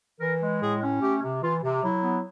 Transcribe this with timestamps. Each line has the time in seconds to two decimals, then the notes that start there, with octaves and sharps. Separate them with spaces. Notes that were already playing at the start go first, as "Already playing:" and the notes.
0.21 E3 A#4
0.41 G#3
0.62 A2 G#4
0.82 C#4
1.02 A3 G4
1.23 C3
1.43 E3 F4
1.63 C3
1.84 F#3 E4
2.03 B3